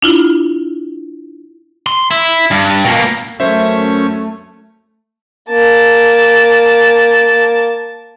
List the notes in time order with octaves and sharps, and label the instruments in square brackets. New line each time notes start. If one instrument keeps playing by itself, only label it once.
[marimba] D4 E4 F4
[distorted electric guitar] C6
E4
G2
B2 A#3
[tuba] F#2 [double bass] A3 [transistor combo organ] C#4 [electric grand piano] C5 E5
[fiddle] A#3 A5